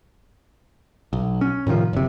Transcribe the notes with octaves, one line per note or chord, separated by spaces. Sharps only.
B1
C#4
A2 C3 D#3 F3
F#1 C3